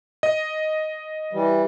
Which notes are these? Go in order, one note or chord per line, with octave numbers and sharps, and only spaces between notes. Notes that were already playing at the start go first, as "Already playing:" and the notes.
D#5
E3 G3